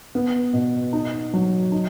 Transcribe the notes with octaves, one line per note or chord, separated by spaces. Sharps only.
B3
B2
D#4
F#3
D#4